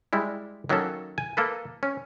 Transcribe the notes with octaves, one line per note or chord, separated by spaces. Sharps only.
G3 G#3 E4
D#3 F#3 A#3 C#4 A4
G#5
A#3 A4 B4
C#4